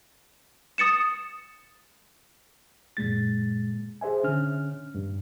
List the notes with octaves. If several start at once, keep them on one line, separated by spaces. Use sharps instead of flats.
D#6 A6 C#7 E7
F#2 A#2 G#3 A6
G#4 C5 E5 G#5
D3 C#4 F6
G2